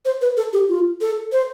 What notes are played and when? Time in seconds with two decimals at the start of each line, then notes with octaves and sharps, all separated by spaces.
0.05 C5
0.21 B4
0.37 A4
0.53 G4
0.69 F4
1.01 A4
1.32 C5